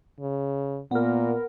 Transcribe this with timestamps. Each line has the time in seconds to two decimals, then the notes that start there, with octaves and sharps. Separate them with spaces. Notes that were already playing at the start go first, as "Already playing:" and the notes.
0.20 C#3
0.91 A#2 B3 A#4